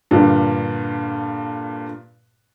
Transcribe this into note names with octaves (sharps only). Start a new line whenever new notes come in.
G2 A#2 D3